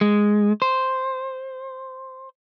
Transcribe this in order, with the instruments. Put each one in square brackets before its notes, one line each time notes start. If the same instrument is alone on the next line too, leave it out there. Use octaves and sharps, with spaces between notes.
[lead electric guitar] G#3
C5